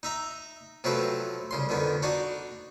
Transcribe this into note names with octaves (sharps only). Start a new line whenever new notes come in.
D#4 E5 A#5
C3 F3 F#3 A3 C4 B4
C2 C#3 C6
F2 D3 D#3 B3
D4 D#4 F#4 D5